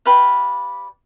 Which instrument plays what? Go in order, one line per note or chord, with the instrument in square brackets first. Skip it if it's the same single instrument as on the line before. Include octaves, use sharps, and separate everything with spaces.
[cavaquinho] G4 B4 D5 F5